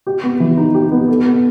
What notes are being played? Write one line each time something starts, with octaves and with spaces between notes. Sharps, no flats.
G4
B3
E3
D#4
G4
B3
A4
B3